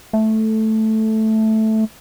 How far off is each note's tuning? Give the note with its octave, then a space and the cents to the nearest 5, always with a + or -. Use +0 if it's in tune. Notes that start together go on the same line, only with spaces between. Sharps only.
A3 -5